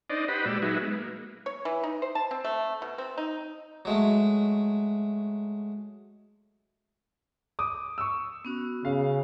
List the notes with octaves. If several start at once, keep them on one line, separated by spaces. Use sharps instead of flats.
D4 D#4 C5 D5 D#5
G4 B4 C5 D#5 F#5 B5
A#2 G#3 F#4 G4 D5 E6
F#3 D#4 F#4 G#4 B4 E5
G#3 B3
A#3
C#5
E3
D#4
C5
A5
C4
A3
B2
C4
D#4
F#3 G#3 A3
D6 D#6
C#6 E6
B3 C#4 F#4
C#3 F5